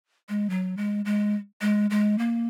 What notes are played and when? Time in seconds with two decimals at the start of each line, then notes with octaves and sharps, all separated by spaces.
0.29 G#3
0.50 F#3
0.77 G#3
1.05 G#3
1.61 G#3
1.90 G#3
2.18 A#3